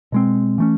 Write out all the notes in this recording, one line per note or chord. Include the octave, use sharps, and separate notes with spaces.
B2 G#3 C4
E3 A3 C#4